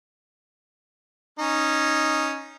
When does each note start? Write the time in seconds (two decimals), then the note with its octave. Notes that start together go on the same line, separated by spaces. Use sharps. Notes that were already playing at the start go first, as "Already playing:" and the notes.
1.39 C#4 D#4